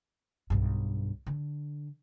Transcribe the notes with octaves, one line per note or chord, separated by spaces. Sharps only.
B1 G2
D3